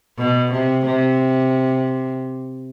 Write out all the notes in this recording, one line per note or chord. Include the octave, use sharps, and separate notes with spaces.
B2
C3
C3